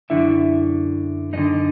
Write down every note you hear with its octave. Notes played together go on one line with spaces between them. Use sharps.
F#2 D3 E4 E5
F#2 D3 D#4 D#5